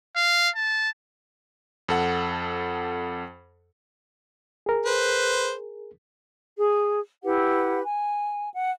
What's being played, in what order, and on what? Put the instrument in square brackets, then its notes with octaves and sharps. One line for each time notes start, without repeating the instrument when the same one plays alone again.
[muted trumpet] F5
A5
[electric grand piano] F2 A4 F#5
[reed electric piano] G#4 A#4
[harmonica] B4 C5
[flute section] G#4
E4 G4 B4 F#5
G#5
F#5